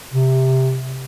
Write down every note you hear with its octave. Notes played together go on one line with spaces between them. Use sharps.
C3